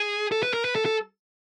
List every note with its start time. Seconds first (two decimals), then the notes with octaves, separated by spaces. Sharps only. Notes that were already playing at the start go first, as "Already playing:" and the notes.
Already playing: G#4
0.32 A4
0.43 B4
0.54 A#4
0.65 B4
0.75 A4
0.86 A4